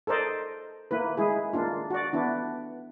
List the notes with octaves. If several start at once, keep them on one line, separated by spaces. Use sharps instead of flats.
A4 A#4 C5 D5 D#5
A#3 E4 B4
G#3 E4 G#4
A#3 D4 F4
F#4 D5
B3 D4 E4